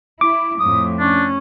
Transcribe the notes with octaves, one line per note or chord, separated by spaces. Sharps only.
E4 D6
F2 A2 D#6
C#4 D4